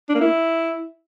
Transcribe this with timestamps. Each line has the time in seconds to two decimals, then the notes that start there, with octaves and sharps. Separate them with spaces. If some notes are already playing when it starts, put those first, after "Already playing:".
0.09 D4
0.15 A#3
0.21 E4